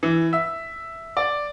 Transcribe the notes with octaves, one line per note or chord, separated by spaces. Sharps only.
E3
E5
D5